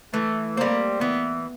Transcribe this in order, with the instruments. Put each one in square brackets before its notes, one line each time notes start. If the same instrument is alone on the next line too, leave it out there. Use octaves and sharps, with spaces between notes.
[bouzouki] E3 [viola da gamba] A3
[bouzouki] G3 C4 [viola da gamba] A#3
[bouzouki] E3 [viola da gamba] B3